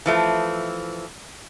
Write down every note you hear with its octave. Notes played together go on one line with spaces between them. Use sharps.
E3 F3 A3